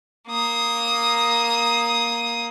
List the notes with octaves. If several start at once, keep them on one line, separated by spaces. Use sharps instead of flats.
A#3 D#6